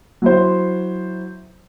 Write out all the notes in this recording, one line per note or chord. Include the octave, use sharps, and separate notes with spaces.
F#3 E4 C5